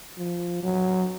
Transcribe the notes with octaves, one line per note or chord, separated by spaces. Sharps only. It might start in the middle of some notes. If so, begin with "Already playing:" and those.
F3
F#3